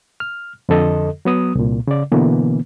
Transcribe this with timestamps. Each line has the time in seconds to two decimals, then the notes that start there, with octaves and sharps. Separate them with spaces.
0.20 F6
0.69 F2 D3 A4 D#5
1.25 F#3 B3 D#6
1.55 C2 A#2
1.87 C#3 D5
2.12 B2 D3 E3 A#3 B3